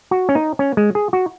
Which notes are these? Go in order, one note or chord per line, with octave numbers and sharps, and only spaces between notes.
F#4
C#4
D#4
C#4
G#3
G#4
F#4